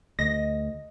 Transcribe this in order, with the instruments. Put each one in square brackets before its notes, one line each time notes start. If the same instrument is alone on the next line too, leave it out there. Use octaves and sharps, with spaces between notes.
[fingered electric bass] D2 [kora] D#5 [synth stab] A#6